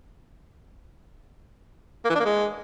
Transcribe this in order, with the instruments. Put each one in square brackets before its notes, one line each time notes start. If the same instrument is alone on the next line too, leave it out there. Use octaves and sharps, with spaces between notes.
[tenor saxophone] A#3
E3
D4
A#3
G#3